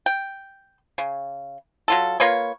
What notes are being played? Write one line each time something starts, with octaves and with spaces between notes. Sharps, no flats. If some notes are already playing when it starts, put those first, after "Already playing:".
G5
C#3
F#3 F4 A4
A#3 F4 B4 C#5